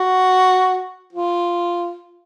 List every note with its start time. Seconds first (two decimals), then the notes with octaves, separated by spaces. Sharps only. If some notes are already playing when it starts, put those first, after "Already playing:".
Already playing: F#4
1.13 F4